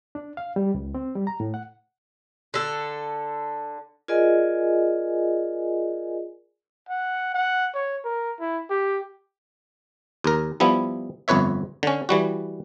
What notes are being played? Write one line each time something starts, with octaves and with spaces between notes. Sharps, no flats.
D4
F5
G3
C#2
C4
G3
A#5
A2
F#5
D3 A4
F4 G#4 A#4 D5 D#5 G#5
F#5
F#5
C#5
A#4
E4
G4
D#2 A#4
F3 G3 B3 E4
G1 F2 B4 C#5 E5
D3 C#4
E3 G3 F#4